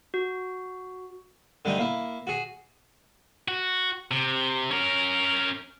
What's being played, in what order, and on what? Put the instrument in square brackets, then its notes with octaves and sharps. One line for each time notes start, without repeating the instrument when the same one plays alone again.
[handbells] F#4
[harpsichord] D3 G3 A3 D#4
A#3 E4
F#4 G#4
[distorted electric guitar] F#4
C3
C#4 A#4